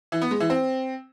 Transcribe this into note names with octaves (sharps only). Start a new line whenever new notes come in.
E3
B3
G#3
E3
C4